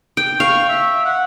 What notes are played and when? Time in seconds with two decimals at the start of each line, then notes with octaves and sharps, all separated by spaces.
0.17 G5
0.40 F5 C#6
0.69 E5
1.05 F#5